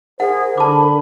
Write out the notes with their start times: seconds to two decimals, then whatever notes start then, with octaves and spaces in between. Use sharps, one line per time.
0.20 G#4 A#4 C5 F#5
0.57 D3 A5 B5 D6